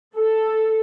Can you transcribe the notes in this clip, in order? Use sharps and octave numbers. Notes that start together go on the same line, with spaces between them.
A4